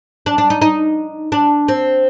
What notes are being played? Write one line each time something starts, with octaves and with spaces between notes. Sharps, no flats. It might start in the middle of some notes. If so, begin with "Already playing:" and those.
D4
D4
D#4
D#4
D4
C4